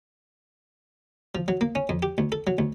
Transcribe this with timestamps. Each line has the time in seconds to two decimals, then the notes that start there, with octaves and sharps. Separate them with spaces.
1.35 F3
1.48 F#3
1.61 A#3
1.75 C#4
1.89 F2
2.03 G4
2.18 D2
2.32 A4
2.47 F#3
2.58 D2